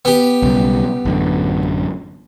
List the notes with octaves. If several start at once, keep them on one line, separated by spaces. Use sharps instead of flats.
B3 G4
B1 C#3 G3
A1 F#2 D3